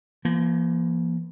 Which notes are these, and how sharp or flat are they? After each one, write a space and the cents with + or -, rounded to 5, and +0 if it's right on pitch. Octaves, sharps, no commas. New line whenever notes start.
F3 -40 A#3 +25